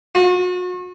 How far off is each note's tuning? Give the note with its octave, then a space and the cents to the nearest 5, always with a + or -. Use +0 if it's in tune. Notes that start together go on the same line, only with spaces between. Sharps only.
F#4 -40